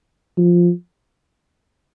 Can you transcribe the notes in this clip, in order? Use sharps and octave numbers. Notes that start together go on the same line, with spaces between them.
F3